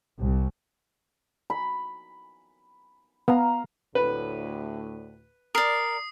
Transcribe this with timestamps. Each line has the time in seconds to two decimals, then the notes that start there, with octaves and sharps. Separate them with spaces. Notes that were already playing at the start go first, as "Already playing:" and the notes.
0.19 C2
1.50 B5
3.28 B3 F5 A#5
3.95 D2 A2 B4
5.55 A#4 D5 D#6 C7